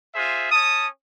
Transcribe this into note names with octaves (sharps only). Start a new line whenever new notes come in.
F4 G#4 C5 E5
C#4 A5 D#6